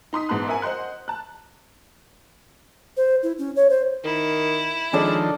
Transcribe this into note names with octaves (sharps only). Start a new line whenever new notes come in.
D#4 C6 D#6 B6
A1 G#2 B3 A5 C6 F#6
A#4 E5 F#5 G#5
C5 D#5 F#5 C6 F#6
A5 F#6
C5
E4
C#4
C#5
C5
D#3 E4
D#3 F3 G#3 D4 A4 D5